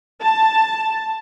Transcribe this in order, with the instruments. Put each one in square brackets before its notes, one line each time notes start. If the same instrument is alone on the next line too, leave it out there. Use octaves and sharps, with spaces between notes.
[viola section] A5